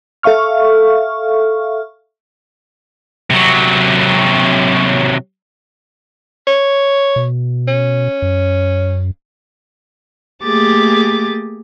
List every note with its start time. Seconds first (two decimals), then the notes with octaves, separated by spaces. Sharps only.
0.23 A4 E5 F5 C#6 F6
3.30 C3 F#3
6.47 C#5
7.16 B2
7.68 C#4
8.22 F#2
10.42 A3 A#3 G4 G#4 D6 A6